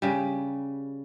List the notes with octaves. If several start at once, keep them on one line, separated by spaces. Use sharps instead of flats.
C#3 G3